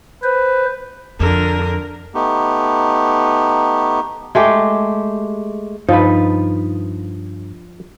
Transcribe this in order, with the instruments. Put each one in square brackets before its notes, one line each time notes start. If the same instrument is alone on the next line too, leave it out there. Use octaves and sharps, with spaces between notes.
[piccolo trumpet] B4 [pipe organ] C5
[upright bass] F2 [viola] D3 A#4
[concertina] A3 B3 D#4 G4
[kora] G#3 A3 G4
[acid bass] G2 [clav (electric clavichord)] F3 [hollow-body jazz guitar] D#4 F4 B4